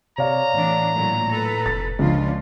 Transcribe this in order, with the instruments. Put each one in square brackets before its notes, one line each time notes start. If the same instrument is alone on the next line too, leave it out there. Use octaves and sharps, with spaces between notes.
[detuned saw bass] C3 [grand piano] C#5 D5 F5 [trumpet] A#5
[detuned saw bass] A2 [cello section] E3 B3 D4
[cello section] A#2 D3 F#3
A4 B4
[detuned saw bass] F1 [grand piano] A6
[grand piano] C#2 [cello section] F3 C#4 F4 [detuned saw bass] D4